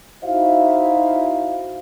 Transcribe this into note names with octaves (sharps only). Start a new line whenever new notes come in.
D#4 E4 F#4 C5 E5 F5